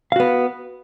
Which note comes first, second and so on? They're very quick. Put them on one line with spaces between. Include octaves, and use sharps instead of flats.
F5 F#4 B3